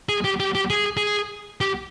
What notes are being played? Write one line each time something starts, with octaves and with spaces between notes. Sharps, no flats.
G#4
G4
G4
G4
G#4
G#4
G4